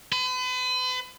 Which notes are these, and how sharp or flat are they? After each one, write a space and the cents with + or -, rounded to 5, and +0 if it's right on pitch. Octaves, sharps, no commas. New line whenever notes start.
B4 +40